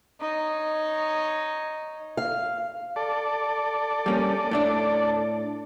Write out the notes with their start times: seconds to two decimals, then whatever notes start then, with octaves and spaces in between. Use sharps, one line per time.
0.20 D#4 C#5
2.17 F5
2.96 A4 D5
4.06 G3 A#3 C#4
4.51 A2 A3 D4